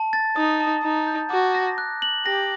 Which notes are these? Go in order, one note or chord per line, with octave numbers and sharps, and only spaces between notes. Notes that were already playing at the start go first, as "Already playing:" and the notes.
Already playing: A5
A6
D#4 D#6
A5
D#4 A#5
G6
F#4 D6
A#6
F#6
F#7
G4 A#6